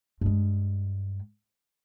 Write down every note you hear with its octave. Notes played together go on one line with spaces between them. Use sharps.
G2 G#3